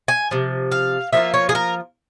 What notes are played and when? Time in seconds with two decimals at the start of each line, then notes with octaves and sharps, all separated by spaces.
0.08 G#5
0.31 C3 F3
0.72 F5
1.13 F3 A#3 F4 E5
1.34 C#5
1.49 G#4
1.55 A#4